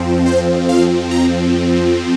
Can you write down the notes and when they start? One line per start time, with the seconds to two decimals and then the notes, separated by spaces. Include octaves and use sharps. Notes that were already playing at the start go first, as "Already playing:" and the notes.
Already playing: F2 F3 C4
0.26 C5
0.69 F5
1.11 A#5